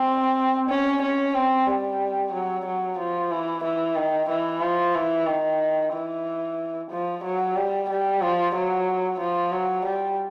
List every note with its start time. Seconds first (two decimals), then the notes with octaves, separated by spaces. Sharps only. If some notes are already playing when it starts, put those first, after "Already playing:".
Already playing: C4
0.69 C#4
1.02 C#4
1.35 C4
1.67 G3
2.32 F#3
2.65 F#3
2.98 F3
3.31 E3
3.64 E3
3.96 D#3
4.29 E3
4.62 F3
4.95 E3
5.27 D#3
5.93 E3
6.91 F3
7.24 F#3
7.56 G3
7.89 G3
8.22 F3
8.55 F#3
9.20 F3
9.53 F#3
9.85 G3